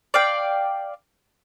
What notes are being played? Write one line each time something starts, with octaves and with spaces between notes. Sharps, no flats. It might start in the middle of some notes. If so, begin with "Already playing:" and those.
D5 F5 G5